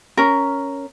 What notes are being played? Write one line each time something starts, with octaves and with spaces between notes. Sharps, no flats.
C#4 A#4